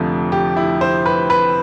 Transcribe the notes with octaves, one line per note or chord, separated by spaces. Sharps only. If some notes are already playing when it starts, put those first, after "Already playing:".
Already playing: F1 F2 D3 F3 A3
G4
E4
C5
B4
B4